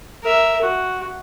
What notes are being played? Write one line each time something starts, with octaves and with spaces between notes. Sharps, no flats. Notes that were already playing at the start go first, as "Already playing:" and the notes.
A#4 E5
F#4